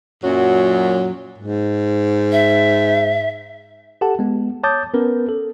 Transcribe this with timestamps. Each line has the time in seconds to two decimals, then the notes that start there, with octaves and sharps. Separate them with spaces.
0.24 F#2 A#2 F#3
1.38 G#2
2.32 E5
4.01 G4 A4 F#5 A5
4.19 G#3 B3
4.63 C#5 A5 D6 D#6 G6 A6
4.94 B3 C#4 A#4 B4
5.29 A4